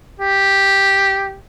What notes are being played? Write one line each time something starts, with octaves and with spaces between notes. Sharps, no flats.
G4